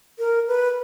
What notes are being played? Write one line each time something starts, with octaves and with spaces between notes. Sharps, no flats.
A#4
B4